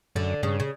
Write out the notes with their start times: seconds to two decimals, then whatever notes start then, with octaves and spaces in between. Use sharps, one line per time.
0.16 F#2 D3
0.43 G2 C#3
0.60 C#3